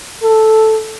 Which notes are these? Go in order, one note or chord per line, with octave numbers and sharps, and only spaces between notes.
A4